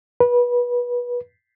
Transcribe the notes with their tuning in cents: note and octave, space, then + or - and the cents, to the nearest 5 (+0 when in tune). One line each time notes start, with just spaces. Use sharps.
B4 -25